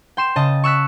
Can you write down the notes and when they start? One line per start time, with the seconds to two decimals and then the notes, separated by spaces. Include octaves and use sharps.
0.17 G5 C6 E7
0.36 C#3 D#5 A5
0.64 C#6 E6 F#6 B6